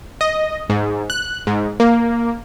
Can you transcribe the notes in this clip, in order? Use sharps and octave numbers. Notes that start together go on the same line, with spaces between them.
D#5
G#2
F#6
G#2
A#3